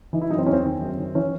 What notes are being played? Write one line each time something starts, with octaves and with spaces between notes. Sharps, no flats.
E3 D#4
E4
F#2 D#4
C4
E2 C#4
C4
D#3
F#2
D#3
E3 C#4